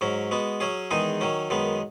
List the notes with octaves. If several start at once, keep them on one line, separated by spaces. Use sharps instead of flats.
G#2 F#3 C#4
G#3 B3 F#4
F#3 C#4 G#4
E2 D#3 G#3 D#4 G#4
D#3 F#3 C#4
F#2 D#3 G#3 B3